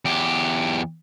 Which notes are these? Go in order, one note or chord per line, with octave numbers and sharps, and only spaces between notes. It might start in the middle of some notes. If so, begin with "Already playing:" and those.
E2 G4